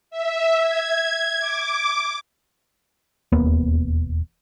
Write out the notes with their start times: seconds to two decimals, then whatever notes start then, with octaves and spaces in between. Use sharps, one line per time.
0.10 E5
0.61 G#6
1.40 D6
3.32 E1 D#2 A#3 B3